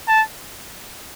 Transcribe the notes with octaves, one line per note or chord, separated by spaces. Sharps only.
A5